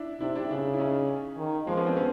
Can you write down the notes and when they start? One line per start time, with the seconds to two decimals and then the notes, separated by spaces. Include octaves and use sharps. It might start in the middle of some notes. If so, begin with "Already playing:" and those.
Already playing: D4 E4
0.21 C3 D4 E4
0.35 D4 E4
0.50 C#3 D4 E4
0.74 E4
0.79 C#4 D#4
1.38 D#3
1.67 F3 G#3 A#3
1.77 B3 C#4
1.87 C4 D4
1.96 B3 C#4